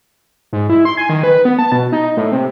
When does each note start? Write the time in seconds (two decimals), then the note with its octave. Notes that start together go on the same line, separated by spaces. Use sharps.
0.53 G#2
0.69 E4
0.85 C6
0.97 G#5
1.09 D#3
1.23 B4
1.45 B3
1.59 A5
1.72 B2
1.92 D#4
2.17 A2
2.32 C3